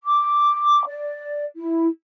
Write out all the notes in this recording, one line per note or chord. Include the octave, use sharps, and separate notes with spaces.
D6
D5
E4